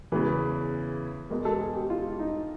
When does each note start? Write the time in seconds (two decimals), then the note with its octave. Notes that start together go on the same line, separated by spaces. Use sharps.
0.12 E2 C#3 E3 B4
1.30 E2 B2 G#3 A#4
1.45 A4
1.60 G#4
1.75 G4
1.90 F4
2.19 D#4